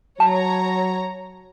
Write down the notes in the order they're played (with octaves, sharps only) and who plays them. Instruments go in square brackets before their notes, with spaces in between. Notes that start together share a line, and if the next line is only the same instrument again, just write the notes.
[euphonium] F#3 [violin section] C#5 A#5 [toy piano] A5